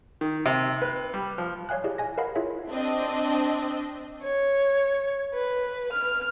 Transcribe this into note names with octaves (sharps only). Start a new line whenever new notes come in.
D#3
C3
B4
G3
F3
C#5 D5 F5 G#5 F#6
E4 G4 G#4 D5 D#5
D#5 G#5 A#6
A#4 B4 D#5 F5 F#5 B5
E4 F4 G#4 C#5 E5
C4 D4 D#5
C#5
B4
F6